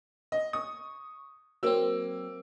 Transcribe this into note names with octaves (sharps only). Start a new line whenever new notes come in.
D#5
C#6 D#6
F#3 A#3 C4 E6